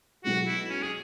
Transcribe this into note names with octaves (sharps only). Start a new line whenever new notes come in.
B1 B2 G#3 F#4
E4
C#4
G#4